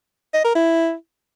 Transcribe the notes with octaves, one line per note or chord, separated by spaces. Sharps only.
D#5
A#4
E4